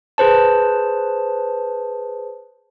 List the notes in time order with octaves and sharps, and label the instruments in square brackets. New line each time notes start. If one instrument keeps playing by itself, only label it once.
[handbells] G#4 B4 C5 A5